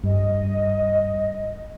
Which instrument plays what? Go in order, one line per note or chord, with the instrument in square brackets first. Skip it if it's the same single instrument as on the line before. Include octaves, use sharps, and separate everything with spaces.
[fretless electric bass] G2 [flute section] D#5